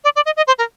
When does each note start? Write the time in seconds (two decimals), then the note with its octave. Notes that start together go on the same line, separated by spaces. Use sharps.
0.04 D5
0.16 D5
0.26 D#5
0.37 D#5
0.47 C5
0.58 A#4